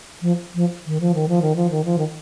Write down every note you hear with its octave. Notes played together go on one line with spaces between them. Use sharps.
F3
F3
D#3
F3
D#3
F3
D#3
F3
D#3
F3
D#3